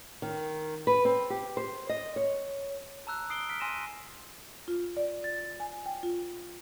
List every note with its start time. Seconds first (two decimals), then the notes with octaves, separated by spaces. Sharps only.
0.22 D#3
0.87 B4
1.05 C4
1.30 G4
1.57 C5
1.89 D#5
2.16 C#5
3.07 A5 A#5 E6 F#6
3.30 D#6 C7 D7 G7
3.49 F6 B6 D7
3.60 G#5 C6 E6 A#6 D#7 E7
4.68 F4
4.97 D5
5.24 A6
5.60 G#5
5.86 G5
6.03 F4